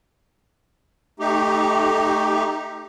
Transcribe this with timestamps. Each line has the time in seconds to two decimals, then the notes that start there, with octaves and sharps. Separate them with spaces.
1.20 A3 D#4 G4